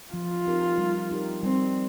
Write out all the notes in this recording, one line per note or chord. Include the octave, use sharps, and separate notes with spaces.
F3 F4
C4 D#4 G4 A#4
G3
D#4 G4 A#4
G3 C4